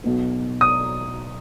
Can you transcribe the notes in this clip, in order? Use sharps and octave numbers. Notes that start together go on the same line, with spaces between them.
B1 B2 B3
D#6